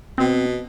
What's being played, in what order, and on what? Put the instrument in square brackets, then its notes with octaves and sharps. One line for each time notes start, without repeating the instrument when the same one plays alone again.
[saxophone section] B2 [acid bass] C4